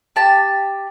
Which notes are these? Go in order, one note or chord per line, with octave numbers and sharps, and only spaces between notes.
G4 A5